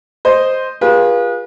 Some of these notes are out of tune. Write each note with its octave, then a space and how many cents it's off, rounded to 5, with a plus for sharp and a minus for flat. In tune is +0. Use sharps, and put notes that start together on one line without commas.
C5 +0 D#5 +0
F4 +10 G#4 -25 B4 -35